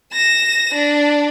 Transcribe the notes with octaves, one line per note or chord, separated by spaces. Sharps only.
A#6 E7
D4